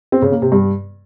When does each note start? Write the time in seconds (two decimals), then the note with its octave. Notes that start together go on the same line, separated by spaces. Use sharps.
0.12 C4
0.22 C#3
0.32 A#3
0.42 C3
0.52 G2